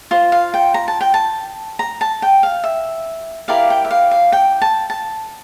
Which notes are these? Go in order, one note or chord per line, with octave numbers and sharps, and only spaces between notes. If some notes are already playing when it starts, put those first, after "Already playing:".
F4 C5
F5
G5
A#5
A5
G5
A5
A#5
A5
G5
F5
E5
E4 G4 A#4 D5 F5
G5
E5
F5
F5
G5
A5
A5